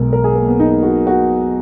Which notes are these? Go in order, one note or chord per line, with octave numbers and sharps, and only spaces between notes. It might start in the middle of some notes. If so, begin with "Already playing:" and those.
Already playing: B1 B2 G#3 A#4
A#4
G#4
A#3
B3
D#4
F#4
F#4